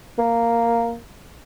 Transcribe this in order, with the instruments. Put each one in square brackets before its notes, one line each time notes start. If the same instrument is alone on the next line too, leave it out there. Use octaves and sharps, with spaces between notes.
[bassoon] A#3